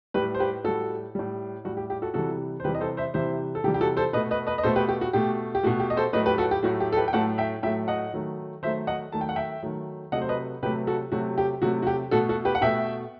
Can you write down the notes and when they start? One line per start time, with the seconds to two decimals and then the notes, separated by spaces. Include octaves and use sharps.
0.14 A2 G3 G4 B4
0.35 C5
0.39 G4 B4
0.64 A2 G3 F#4 A4
1.15 A2 G3
1.65 A2 G3 F#4
1.77 G4
1.90 G4
2.02 F#4 A4
2.14 C3 E3 G3 F#4 A4
2.60 C5
2.64 C3 E3 G3 G4 B4
2.75 D#5
2.81 A4 C5
2.97 C5 E5
3.14 C3 E3 G3 C5 E5
3.55 A4
3.64 C3 E3 G3 G4
3.74 G4
3.81 F#4 A4
3.97 A4 C5
4.13 B2 A3 B4 D#5
4.31 B4 D#5
4.47 B4 D#5
4.58 D#5
4.63 B2 A3 A4 C5
4.76 G4 B4
4.88 G4
5.01 F#4
5.13 B2 A3 G4
5.55 G4
5.63 A3 F#4
5.67 B2
5.80 G4
5.90 D#5
5.97 A4 C5
6.13 A2 F#3 A3 B4 D#5
6.26 G4 B4
6.38 F#4 A4
6.51 G4
6.63 A2 F#3 A3 F#4
6.80 G4
6.93 A4
6.97 G4 B4
7.08 G5
7.13 A2 F#3 A3 F#5 A5
7.38 E5 G5
7.63 A2 F#3 A3 E5 G5
7.88 D#5 F#5
8.13 D#3 F#3 A3
8.63 D#3 F#3 A3 C5 E5
8.87 D#5 F#5
9.12 D#3 F#3 A3 A5
9.21 G5
9.29 F#5
9.36 E5 G5
9.63 D#3 F#3 A3
10.12 C3 F#3 A3 D#5 F#5
10.21 C5
10.29 B4 D#5
10.63 C3 F#3 A3 G4 B4
10.87 F#4 A4
11.12 C3 F#3 A3 F#4
11.38 G4
11.62 C3 F#3 A3 F#4
11.82 F#4
11.87 G4
12.11 B2 A3 F#4 A4
12.29 F#4 A4
12.45 G4 B4
12.55 F#5
12.61 B2 A3 E5 G5